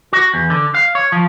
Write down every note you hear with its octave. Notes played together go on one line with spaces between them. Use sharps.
F#4
E2
D3
F5
C#5
F3